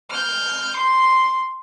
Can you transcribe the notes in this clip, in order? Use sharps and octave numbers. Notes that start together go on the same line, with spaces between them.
F6 G6
C6